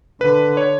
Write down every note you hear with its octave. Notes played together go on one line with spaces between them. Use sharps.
D3 B4
C#5